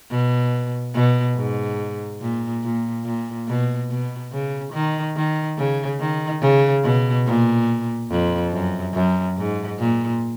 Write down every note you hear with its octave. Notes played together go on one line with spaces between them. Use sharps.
B2
B2
G#2
A#2
A#2
A#2
B2
B2
C#3
D#3
D#3
C#3
D#3
C#3
B2
A#2
F2
F#2
F#2
G#2
A#2